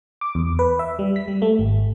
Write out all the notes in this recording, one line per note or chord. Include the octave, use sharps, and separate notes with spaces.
D6
E2
B4
E5
G3
B6
G3
A3
G#1